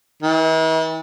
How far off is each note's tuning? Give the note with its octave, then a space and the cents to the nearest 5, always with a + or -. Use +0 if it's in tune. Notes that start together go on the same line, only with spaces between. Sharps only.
E3 -45